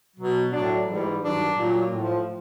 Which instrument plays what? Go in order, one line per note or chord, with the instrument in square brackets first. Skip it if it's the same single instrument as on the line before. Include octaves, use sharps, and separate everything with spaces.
[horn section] B2 F#3
A2 F#3 D4
G#2 E3 G3
G2 D#3 F#3 D4
A#2 F#3
A2 F3